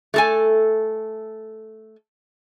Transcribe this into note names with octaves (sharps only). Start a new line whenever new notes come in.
A3 A4 G#5